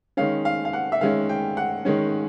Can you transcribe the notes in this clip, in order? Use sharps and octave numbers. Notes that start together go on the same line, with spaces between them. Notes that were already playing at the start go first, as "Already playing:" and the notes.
D#3 G#3 C#4 F5
F5
F5
F#5
E5
D#3 G#3 C#4 F5
G5
F#5
D#3 G#3 C#4